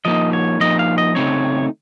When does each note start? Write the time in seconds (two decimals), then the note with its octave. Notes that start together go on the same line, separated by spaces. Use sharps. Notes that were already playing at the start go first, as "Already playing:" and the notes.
0.05 F3 A#3 D#4 D#5
0.33 C#5
0.60 F3 A#3 D#4 D#5
0.79 F5
0.98 D#5
1.15 C#3 A3 C4 D#4 C#5